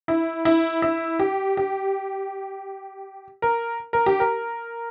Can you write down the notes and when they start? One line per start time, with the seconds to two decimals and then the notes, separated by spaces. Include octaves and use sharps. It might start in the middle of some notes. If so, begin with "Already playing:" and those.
0.08 E4
0.45 E4
0.82 E4
1.19 G4
1.57 G4
3.42 A#4
3.93 A#4
4.06 G4
4.20 A#4